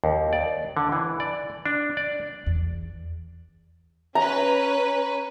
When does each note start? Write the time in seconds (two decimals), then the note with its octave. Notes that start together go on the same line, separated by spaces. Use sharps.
0.04 D#2
0.33 D5
0.77 D3
0.92 E3
1.20 D5
1.66 D4
1.97 D5
2.46 E2
4.15 C#4 B4 A#5